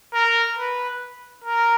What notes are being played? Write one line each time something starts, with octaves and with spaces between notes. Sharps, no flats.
A#4
B4
A#4